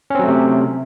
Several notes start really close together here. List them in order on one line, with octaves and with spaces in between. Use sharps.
C#4 C4 F#3 A3 C3